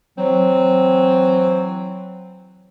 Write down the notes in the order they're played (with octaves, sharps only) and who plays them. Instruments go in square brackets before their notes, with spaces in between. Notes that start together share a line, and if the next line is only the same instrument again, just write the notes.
[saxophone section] E3 C4 [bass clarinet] F#3